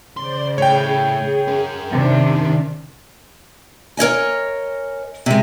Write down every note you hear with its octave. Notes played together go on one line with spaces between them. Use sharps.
C#3 C5 D5 C6
A2 G#4 C#5 G5
C#4 A#4
C3 D#3 D4
A#4 C#5 D#5 G#5
C3 G#3